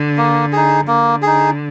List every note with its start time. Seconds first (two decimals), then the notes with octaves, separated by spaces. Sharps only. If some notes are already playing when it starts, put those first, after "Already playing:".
Already playing: D3
0.17 A#3
0.52 D#4 G#4
0.88 D3 A#3
1.22 D#4 G#4